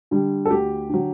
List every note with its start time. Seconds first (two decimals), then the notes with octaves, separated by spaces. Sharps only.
0.11 D3 G3
0.45 A4
0.50 D2 G4
0.89 D3 F#3